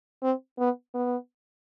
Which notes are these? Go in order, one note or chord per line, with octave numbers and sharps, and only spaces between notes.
C4
B3
B3